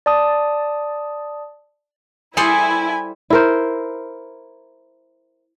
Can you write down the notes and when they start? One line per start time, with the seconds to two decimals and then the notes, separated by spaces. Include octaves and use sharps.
0.06 D5 A5 D#6
2.37 G3 E4 G#4 A4 C5 G#5
3.30 E4 A#4 C5